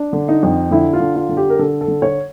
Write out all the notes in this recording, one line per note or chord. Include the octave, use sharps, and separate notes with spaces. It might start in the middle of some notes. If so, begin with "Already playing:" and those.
Already playing: D4
D3
D#4
F2
D3 E4
F4
D3
F4
D3
G4
A#4
D3 A4
A4
D3
C#5